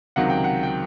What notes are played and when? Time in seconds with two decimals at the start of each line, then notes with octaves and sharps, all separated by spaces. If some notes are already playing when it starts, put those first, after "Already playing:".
0.16 C#2 C3 D#3 F#3 F#5
0.30 G5
0.44 F#5
0.63 G5